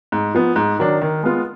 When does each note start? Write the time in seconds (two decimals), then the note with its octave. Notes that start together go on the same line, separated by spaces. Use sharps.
0.12 G#2
0.35 F3 B3
0.56 G#2
0.79 D#3 F#3 D4
1.02 D#3
1.23 G#3 B3 F4